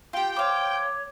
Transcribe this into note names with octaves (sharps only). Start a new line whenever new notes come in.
F4 G4 G5
C5 C#5 F5 D6